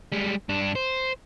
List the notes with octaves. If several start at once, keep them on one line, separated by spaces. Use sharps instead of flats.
G3 G#3
G2 D4
C5